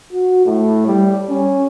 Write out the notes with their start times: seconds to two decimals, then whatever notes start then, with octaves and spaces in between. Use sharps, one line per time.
0.13 F#4
0.46 A2
0.86 G3
1.29 C#4